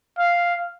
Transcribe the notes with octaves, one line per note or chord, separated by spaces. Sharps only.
F5